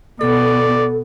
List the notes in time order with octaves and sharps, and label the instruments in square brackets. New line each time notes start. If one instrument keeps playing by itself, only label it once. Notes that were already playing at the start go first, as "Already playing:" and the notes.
[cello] B2 B3 [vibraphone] A4 [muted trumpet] D5